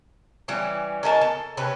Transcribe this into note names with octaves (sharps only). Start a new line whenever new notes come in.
E3 G3 C#4
C#4 A#4 D#5 A5
A4
C3 C#4 B4